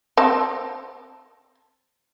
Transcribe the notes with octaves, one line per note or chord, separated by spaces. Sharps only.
C4 A5